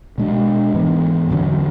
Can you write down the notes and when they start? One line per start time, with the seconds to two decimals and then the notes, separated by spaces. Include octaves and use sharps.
0.18 B2 G#3 D4
0.74 G#2 E3 B3
1.30 E2 D3 F#3 C#4